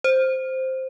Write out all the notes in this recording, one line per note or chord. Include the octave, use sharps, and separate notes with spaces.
C5